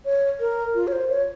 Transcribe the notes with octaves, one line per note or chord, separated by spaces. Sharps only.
C#5
A#4
F4
C#5
C5
C#5